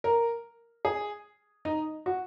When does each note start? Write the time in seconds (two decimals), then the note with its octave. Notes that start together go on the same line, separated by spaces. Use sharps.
0.04 A#4
0.85 G#4
1.65 D#4
2.06 F#4